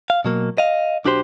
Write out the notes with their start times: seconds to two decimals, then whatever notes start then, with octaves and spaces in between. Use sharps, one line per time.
0.10 F5
0.25 B2 F#3 A#3
0.58 D#5 F5
1.05 B1 D4 F#4 G4 C5 C6